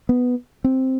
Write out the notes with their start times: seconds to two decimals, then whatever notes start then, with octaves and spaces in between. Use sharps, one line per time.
0.09 B3
0.64 C4